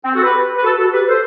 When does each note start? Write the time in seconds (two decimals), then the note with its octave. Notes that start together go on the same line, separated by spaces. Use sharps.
0.04 C4
0.14 F#4 A4
0.23 G4 B4
0.56 B4
0.64 F#4 A4
0.78 F#4 A4
0.93 G4 B4
1.08 A4 C5